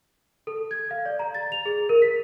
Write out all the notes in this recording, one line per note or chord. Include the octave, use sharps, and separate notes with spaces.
A4
G#6
F5
D5
A#5
A6
F7
G#4
A#4
B6